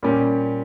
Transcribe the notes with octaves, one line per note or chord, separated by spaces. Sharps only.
A#2 G3 C#4 G4